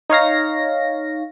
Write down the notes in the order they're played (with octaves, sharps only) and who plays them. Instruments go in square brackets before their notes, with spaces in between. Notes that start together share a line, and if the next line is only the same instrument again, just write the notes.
[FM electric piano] D#4 C#5 F5 A#6